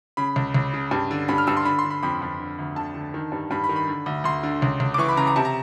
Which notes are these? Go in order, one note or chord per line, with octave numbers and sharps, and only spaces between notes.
C#3 B5
C#2
C#2
C#3
G2
D3
G2 B5
F6
G2 E6
C6
D3 B5
C6
D3
B5
F2 B5
F2
D3
D2
D3 A5
D3
D#3
G2
G2 B5
B5
D#3
B5
D3
D2
D2 C6
D3
C#2
C#2
D6
E3 C#6
B5
C#3 A#5
A#5
C3 A5
A#5